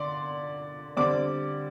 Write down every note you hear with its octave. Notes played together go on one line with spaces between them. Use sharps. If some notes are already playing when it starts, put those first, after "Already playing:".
Already playing: D3 D5 C6 D6
D3 G3 C4 D5 D6